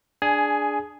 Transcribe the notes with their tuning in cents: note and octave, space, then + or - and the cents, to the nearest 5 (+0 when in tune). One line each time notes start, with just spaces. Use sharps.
D4 +0 G#4 +0 G#5 +15